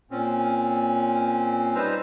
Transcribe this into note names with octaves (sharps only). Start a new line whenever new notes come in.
A#2 C4 C#4
G3 D#4 B4 C5 A#5 E6